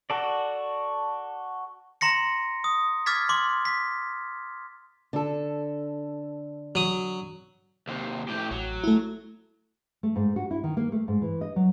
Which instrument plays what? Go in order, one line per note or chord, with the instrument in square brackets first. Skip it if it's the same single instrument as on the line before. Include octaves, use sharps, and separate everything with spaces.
[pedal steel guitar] F#4 A4 D5
[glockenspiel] A#5 C6 A#6 C#7
D#6
D6 F6 G#6 A6 B6
C6 D6
B6
[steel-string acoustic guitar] D3 A4
[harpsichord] F#3 D#6
[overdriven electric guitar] D#2 C3
A2 G4
[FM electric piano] A1 [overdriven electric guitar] F#3
[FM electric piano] A3 E4
[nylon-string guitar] A3
G#2
F#4
E4
D#3
A#3
A3
G#2
E3
D#5
F#3